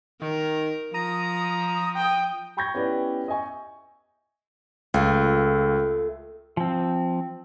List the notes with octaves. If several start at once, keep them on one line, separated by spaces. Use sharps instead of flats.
D#3 A#4
F3 A#5 D#6
G5
G5 B5 C#6 G6 G#6 A#6
B3 C#4 E4 G4 B4 D5
D#5 E5 G#5 C#6
C#2 A3 F4
F3 C4